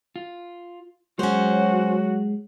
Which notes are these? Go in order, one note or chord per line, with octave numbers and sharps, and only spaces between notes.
F4
F#3 G#3 C#4 F#4 G#4 C5 C#5